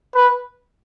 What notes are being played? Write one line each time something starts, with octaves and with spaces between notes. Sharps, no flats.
B4